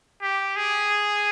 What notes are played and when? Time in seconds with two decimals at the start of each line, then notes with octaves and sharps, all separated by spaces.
0.22 G4
0.56 G#4